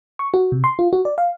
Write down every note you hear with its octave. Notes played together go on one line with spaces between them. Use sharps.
C#6
F#4
C3
C6
F4
F#4
D5
F5